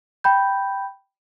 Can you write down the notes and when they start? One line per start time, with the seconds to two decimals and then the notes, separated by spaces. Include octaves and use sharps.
0.24 G5 B5 G6